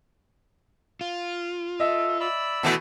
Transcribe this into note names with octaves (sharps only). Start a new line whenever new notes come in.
F4
A4 D#5 E5
D5 B5 E6
B2 E3 A3